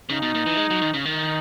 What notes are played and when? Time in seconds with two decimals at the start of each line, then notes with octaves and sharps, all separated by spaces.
0.09 C#3 D#4
0.22 B2
0.35 A#2
0.46 E3
0.57 G#3
0.70 F#3
0.82 D#3
0.94 C#3
1.05 D#3 D#4